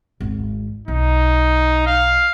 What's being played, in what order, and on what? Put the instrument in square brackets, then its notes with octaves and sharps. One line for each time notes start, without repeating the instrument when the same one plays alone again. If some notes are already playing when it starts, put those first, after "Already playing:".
[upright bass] G#1 D2
[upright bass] B1 [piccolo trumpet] D#4
[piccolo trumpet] F5